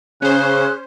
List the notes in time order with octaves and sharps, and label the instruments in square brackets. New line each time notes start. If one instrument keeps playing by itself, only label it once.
[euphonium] C#3 [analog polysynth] C#4 C5 [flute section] G#4 F#6